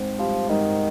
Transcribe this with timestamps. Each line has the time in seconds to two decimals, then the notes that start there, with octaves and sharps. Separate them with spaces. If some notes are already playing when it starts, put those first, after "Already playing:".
Already playing: G#2 C4
0.19 F3 G3
0.49 G#2 D#3